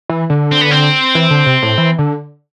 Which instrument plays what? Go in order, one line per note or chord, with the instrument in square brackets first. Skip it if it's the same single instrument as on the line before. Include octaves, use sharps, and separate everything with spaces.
[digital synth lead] E3
D3
[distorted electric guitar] C4
B3
C4
[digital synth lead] E3
D3
C3
A2
E3
D3